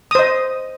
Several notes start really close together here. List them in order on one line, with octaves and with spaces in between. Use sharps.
D#6 C5 D#5